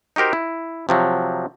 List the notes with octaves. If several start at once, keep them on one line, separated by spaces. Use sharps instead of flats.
D#4 F#4 G4 A#4 C5
E4
C3 F3 F#3